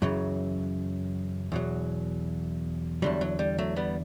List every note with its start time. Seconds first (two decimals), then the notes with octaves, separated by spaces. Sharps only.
0.02 F#2 C#3 E3 F#3
1.52 E2 B2 F#3
3.02 E2 D3 F#3 G3
3.21 F#3
3.39 G3
3.58 F#3 A3
3.76 G3 B3